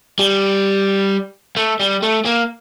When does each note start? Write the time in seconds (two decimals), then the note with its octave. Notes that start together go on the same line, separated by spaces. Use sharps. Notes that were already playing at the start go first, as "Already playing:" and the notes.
0.19 G3
1.57 A3
1.80 G3
2.03 A3
2.26 A#3